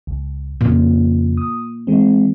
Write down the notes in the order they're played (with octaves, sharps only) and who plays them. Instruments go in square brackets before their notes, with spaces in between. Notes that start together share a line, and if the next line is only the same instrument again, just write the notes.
[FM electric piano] C#2
[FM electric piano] F2 C#3 [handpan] A#2
[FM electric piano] D#6
E3 G#3 C4